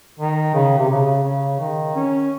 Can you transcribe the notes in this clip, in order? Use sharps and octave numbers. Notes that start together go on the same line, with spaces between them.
D#3
C#3
C3
C#3
C#3
D#3
C#4